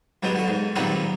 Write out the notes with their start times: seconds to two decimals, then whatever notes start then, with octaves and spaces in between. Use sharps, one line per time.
0.23 G2 F#3 G#3 B3
0.35 D3 F#4
0.48 G#2
0.76 A#2 D#3 F#3 G3 B3 C4